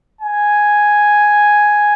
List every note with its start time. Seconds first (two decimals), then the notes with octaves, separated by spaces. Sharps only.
0.21 G#5